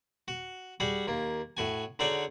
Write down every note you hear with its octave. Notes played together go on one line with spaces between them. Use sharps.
F#4
G3 F#4 G#4
D#2 A#3
A2 F#4 G#5
D3 D#4 F#4 G#4 C#5 D5